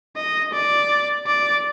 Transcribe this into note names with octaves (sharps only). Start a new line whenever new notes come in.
D#5
D5
D5